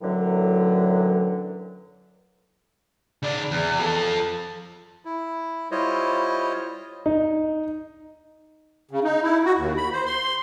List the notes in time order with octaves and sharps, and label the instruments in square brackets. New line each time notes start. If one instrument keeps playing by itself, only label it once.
[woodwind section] F#2 A2 D3 E3 F#3
[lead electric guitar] C#3 D5
E2
F3 A4
[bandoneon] E4
G3 E4 F4 C5 C#5 D#5
[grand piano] D#4
[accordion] C#3
D#4
E4
F#4
D#2
B5
C5
C6